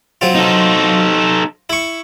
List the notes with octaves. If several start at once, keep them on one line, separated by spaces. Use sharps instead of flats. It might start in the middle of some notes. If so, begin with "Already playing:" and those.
F#3 C4 F4
D#4 A4
E4 C#6